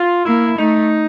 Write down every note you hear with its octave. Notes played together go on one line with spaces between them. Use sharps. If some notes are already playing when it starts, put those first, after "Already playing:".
Already playing: F4
A#3 E4
A3 D#4